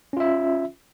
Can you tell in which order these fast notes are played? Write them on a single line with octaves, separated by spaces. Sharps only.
C#4 F4 E5